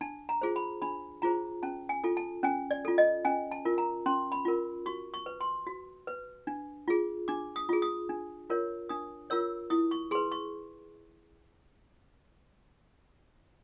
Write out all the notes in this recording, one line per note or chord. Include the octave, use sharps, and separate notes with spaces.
D4 A5
A#5
F4 G#4 C5
B5
D4 B5
F4 G#4 C5 A#5
C#4 A5
G#5
F4 A4
A5
C#4 G#5
D5
F4 A4
D#5
C#4 G#5
A5
F4 A#4
A#5
C#4 C6
B5
F4 A#4
F#4 C#6
C#6
B4
C6
F#4
B4
D4
F4 G#4
D4 D6
D#6
F4 G#4
D#6
D4
F4 A#4 C#5
D4 D#6
F4 A#4 C#5 E6
E4 D#6
C#6
G#4 B4 C6
C#6